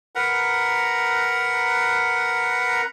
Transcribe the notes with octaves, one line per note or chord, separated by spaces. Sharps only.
A#4 B4 F#5 A#5